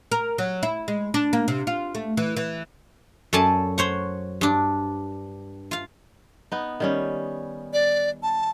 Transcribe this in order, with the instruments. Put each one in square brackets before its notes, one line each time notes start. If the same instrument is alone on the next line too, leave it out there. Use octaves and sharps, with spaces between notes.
[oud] A#4
F#3
E4
G#3
D4
A#3
C3
F4
A3
E3
E3
[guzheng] F#2 A4 D5 G#5 A5
C5 C#5 F#5
G2 D4
F4 F5
[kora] B3 D#4
D#3 G3 C#4
[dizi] D5
A5